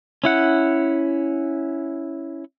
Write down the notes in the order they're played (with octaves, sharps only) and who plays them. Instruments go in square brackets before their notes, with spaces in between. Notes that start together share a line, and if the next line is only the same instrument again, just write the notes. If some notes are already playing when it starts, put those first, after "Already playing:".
[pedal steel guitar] C#4 E4 F#5